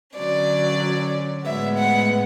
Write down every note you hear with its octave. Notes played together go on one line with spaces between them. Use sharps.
D3 F#3 C#4 D5
A2 G#3 B3 E5
F#5